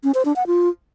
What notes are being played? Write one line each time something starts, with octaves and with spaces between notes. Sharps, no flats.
C#4
C5
D4
F#5
F4